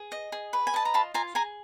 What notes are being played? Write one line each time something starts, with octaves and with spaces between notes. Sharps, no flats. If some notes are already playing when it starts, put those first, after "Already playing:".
Already playing: G#4
D#5
G#4
B4
G#5
D#5 A5
A#5
F4 A5 B5
F4 G#5 A#5
G#4 G#5 A#5